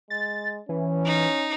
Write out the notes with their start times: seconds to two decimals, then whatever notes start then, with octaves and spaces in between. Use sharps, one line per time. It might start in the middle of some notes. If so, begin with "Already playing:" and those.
0.10 G#3 A6
0.69 E3 C#4
1.05 D#4